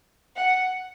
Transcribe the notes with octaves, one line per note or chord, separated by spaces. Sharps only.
F#5